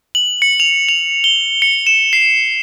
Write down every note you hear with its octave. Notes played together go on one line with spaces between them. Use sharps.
F#7
C#7
F7
F7
G7
C#7
E7
C7